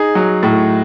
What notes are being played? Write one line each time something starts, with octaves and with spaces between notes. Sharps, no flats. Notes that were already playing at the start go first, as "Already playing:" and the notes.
Already playing: D#4 G#4
F#3
A2